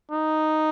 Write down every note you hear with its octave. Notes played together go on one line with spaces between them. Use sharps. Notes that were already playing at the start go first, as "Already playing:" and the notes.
D#4